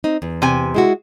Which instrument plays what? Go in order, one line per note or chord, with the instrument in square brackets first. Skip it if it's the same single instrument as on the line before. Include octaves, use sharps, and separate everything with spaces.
[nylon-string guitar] C4 D#4
E2
[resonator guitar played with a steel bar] C3 G#5
[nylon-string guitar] G#3 E4 F#4